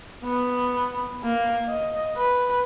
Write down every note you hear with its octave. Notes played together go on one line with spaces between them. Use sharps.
B3
A#3
D#5
B4